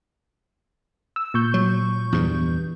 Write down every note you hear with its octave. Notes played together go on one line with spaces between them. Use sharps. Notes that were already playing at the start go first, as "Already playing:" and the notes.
E6
A#2 C#6 G6
F#3
E2 G2